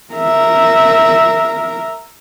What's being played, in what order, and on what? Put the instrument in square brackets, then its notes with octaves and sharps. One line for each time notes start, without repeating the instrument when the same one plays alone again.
[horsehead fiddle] A#4 E5